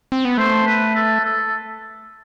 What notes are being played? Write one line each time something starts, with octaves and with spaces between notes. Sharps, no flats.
C4
B3
A3 C5
B4
A4
A4